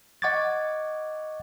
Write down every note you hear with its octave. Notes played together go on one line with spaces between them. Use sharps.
D#5 F#5 C#6 D6 G#6 A6